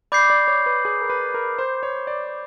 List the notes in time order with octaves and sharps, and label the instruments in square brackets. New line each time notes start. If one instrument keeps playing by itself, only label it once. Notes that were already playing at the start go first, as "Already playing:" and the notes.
[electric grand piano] D5 [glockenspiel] B5 D6 G6 C7
[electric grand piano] D5
C#5
B4
G#4
A#4
B4
A#4
C5
C#5
D5